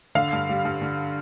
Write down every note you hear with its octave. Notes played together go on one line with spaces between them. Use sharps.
D3 F5
G2
G3
G2
D3